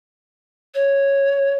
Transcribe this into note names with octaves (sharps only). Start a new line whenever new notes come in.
C#5